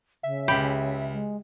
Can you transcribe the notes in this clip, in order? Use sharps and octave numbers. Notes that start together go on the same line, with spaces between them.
C#3 E5
C#2 G4 B5
G#3